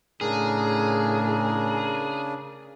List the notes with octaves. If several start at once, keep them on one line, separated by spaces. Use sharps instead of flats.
A2 C#3 D4 G#4 A#4